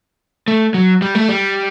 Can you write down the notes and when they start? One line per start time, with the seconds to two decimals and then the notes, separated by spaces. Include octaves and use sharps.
0.48 A3
0.74 F#3
1.02 G3
1.15 A3
1.29 G3